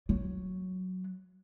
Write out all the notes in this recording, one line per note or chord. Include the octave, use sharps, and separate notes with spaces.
F#3